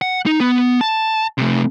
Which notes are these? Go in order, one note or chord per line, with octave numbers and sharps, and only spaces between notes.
F#5
D#4
B3
A5
C3 A3